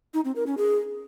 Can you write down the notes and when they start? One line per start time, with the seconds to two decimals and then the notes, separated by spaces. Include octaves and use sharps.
0.14 D#4
0.25 C4
0.36 A#4
0.47 C#4
0.57 G#4